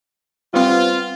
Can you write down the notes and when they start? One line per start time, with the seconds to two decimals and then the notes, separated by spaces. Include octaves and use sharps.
0.54 G3 B3 C4 F4